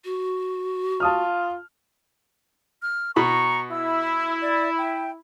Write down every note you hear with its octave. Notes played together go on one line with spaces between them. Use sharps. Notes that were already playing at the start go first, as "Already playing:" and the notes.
F#4
F4 A5 D#6 F6
F6
B2 A#5 B5 C#6
E4 E6
D5
G5